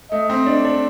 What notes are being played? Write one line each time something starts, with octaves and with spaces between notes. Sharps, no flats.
A3 D#5
C4
D4
D4